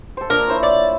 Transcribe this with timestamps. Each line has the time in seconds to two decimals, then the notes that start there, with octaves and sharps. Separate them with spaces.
0.17 A4 C5
0.30 A#2 D4 A#4 C#5
0.48 E4 C5 C#5
0.63 D5